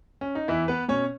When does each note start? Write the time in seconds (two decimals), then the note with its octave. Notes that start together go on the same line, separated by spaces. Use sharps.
0.21 C#4
0.35 D#4
0.48 E2 E3 E4
0.68 B3 B4
0.88 B2 C#4 C#5